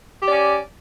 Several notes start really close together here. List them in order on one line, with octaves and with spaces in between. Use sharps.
G4 D5 C#4